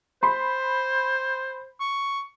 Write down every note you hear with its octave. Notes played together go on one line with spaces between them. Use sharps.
C5 B5 C6
C#6